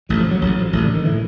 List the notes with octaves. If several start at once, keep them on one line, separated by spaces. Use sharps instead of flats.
A1 A2 F#3
F3
F#3
A1 A2 F#3
F3
A1 A2 E3
D3
D#3
A2 E3